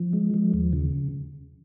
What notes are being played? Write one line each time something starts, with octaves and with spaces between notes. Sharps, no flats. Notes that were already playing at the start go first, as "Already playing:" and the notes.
Already playing: F3
G#3
F3
D#2
C#3